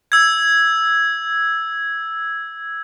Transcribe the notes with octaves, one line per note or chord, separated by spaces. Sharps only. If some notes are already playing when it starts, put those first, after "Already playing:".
E6 G#6